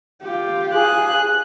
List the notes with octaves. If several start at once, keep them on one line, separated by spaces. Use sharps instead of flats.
F4 G4
G#4 F#6